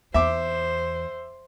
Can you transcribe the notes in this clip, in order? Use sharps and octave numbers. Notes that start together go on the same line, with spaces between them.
E2 C5 E5 D6